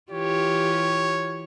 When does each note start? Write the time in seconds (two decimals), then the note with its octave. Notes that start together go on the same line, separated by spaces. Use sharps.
0.11 E3 F4 G4 C#5